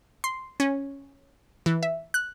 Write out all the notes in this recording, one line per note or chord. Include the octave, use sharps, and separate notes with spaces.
C6
C#4
E3
E5
F#6